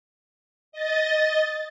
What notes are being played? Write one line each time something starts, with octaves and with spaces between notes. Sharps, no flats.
D#5 A6